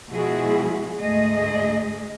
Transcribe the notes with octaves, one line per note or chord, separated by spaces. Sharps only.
B2 F3 G#3 E4 F#4 G#4
D2 G#2 A3 G#4 D#5